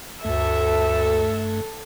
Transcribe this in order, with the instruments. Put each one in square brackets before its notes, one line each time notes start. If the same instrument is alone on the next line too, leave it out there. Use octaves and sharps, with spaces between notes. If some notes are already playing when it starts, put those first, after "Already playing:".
[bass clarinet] D2 [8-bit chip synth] G2 A3 [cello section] A4 [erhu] E5